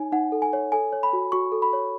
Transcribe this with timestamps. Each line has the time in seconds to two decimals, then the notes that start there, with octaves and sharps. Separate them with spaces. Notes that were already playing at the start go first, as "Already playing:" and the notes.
Already playing: D#4 C#5 G#5
0.12 D#4 F#5
0.32 A4
0.42 G#5
0.53 C#5
0.72 A4 G#5
0.93 C#5
1.03 B5
1.13 F#4
1.32 F#4 C#6
1.52 A4
1.62 B5
1.73 C#5